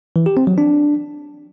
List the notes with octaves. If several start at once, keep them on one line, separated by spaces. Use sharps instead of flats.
E3
G4
C4
F#3
D4